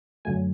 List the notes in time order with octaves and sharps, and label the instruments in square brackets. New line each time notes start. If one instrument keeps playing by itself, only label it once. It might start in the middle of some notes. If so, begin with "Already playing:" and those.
[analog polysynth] F#2 D3 F#3 A3 G#5